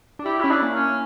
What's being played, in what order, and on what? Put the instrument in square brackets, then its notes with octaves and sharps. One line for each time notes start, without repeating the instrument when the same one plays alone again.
[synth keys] D4
[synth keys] E4 [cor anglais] G4
[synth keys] C#4 [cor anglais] E4
[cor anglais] D4
[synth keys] A#3
[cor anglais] C#4